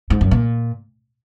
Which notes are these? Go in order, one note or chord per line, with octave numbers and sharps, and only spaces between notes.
G#2
F#2
A#2